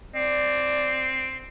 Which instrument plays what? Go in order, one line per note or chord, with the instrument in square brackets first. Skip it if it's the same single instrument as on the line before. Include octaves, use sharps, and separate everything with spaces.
[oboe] C4 [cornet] D5